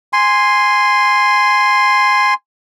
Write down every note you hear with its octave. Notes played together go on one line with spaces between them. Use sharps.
G#5 C6